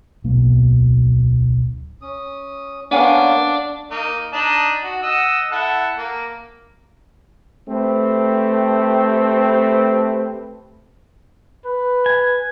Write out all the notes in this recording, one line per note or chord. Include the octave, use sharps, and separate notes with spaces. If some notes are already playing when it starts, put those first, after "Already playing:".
D1 B1 A#3
C#4 D#6
A#3 B3 C#4 D4 F5 F#5 G#5
A#3 D#4
D4 D#4 A5
F#4
D#5 F#5 E6
E4 A4 F#5
A#3
A3 C4 G4 B4
B4
G#5